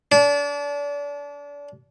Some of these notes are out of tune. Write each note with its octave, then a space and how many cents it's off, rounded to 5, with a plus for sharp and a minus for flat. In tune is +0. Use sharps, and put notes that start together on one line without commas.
D4 -35